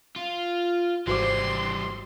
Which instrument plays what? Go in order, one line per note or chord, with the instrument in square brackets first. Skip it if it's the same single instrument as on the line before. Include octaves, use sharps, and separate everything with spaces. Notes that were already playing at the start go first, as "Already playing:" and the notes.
[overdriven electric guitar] F4
[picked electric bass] G#1 [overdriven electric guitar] E3 G3 [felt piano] F#4 C5 D6 [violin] C6